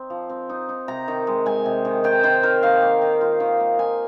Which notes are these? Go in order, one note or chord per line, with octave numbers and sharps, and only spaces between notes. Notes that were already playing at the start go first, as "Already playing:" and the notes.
Already playing: C4 D#4
F3
C4
D#4
D#4
C3 A#5
D#3
G#3
G#3 G#5
C3
D#3
D#3 G5
D#3 C5
D#3 A#4
D#3 F5
A#3
D#3
F4
D#3
A#3
F4 G#5